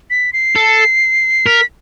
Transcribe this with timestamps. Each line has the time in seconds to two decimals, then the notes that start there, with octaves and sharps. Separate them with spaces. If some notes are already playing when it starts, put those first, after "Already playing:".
0.10 B6
0.33 C7
0.56 A4
1.46 A#4 B6